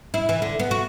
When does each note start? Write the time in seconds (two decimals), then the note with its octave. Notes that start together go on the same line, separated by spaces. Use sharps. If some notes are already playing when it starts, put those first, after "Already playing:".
0.14 E4
0.29 E3
0.42 D3
0.59 B3
0.71 F#4